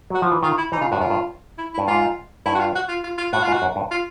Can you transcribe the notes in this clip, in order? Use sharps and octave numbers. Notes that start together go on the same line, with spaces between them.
F#3 F#4
F3
E3
D#3 F4
E4
E3 D#4
C#3 F4
G2 F#4
F#2 F4
G2
E4
E4
G2
G#2 F4
G2 E4
F#4
F4
F#4
F4
F4
F4
A2 F#4
G#2 F4
F#4
F#2
G2
F4